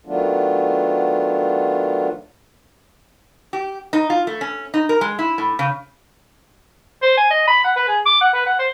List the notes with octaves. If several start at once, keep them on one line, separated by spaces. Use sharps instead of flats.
D#3 F#3 A3 B3 D4 F4
G4
D#4
F4
A3
C#4
D#4
A#4
G#3
E4
A2
C#3
C5
G#5
D#5
B5
F#5
B4
G#4
D6
F#5
B4
F#5
C5